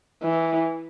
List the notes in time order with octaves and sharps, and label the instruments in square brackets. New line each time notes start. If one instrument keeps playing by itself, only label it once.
[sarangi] E3